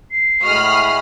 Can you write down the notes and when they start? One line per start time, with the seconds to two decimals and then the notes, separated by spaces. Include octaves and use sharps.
0.11 C7
0.43 A2 G#3 F#4 B5 D#6 F6